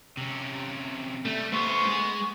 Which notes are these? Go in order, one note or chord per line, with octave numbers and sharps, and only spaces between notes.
C3 C#4
G3 A3
A3 B3 C5 C#6
G#3 G#4